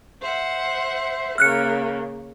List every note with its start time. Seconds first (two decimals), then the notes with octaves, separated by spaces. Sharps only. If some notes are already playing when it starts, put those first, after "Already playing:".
0.21 C5 E5 F#5
1.38 C#3 A#3 F6 F#6 C#7